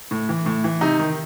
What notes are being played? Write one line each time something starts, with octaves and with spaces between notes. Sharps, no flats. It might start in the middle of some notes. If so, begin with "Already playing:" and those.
A2
E3
A2
E3
C3 D#4
D#3